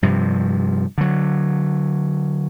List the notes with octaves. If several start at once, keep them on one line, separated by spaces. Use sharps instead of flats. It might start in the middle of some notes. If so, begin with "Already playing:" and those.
G2 C3 F3
D3 F#3